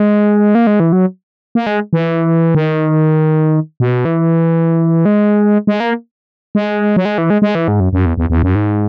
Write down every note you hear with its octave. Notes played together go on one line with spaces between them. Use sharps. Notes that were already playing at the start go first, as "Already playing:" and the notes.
Already playing: G#3
A#3
G#3
E3
F#3
A#3
G#3
E3
D#3
B2
E3
G#3
G#3
A#3
G#3
F#3
G#3
E3
G#3
G#3
E3
G#2
F#2
F#2
E2
E2
E2
F#2
G#2